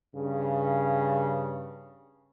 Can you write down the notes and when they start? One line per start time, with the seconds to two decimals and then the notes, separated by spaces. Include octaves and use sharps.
0.15 G2 C#3